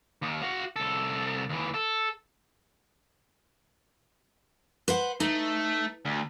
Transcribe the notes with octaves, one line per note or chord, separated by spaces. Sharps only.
D#2 D#3
F#4 F5
C2 A4
D#2 E3
A4
B4 C5 F#5
A3 D#4
D2